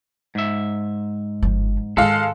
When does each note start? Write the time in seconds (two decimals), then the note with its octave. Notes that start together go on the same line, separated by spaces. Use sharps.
0.35 G#2 E5
1.42 G1 F3
1.97 G#2 D#3 G#3 A4 F5